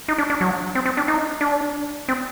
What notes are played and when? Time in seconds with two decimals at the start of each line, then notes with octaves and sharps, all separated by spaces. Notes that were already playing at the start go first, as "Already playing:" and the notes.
0.08 D#4
0.18 D4
0.30 D4
0.41 F#3
0.75 C4
0.86 C4
0.97 D4
1.08 D#4
1.41 D4
2.08 C4